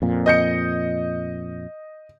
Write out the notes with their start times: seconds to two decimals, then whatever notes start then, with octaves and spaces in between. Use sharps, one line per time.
0.02 F2 A#2
0.26 D#5 G6 C#7